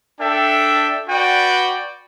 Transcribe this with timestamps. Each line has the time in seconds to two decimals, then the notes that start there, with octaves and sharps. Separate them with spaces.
0.19 D4 A4 E5 G5
1.08 F#4 B4 D5 G5